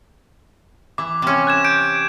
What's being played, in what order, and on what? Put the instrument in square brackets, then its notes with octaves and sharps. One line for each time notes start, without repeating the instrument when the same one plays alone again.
[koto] E3 [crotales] D6
[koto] C3 C#4
[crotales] F#6 G#6 E7
G6 D7